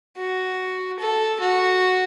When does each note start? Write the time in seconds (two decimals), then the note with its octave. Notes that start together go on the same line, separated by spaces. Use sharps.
0.17 F#4
0.99 A4
1.40 F#4